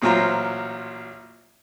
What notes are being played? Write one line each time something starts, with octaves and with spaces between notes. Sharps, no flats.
A1 A#2 F#3 F4 C5 A#5